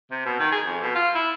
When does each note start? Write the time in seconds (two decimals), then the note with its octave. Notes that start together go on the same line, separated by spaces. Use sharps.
0.11 C3
0.26 B2
0.40 D#3
0.52 G#4
0.65 F2
0.81 B2
0.95 F4
1.15 E4